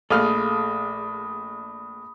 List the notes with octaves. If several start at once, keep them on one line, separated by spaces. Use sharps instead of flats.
A#1 A3 G#4 A4 F5 B5 D#6 F6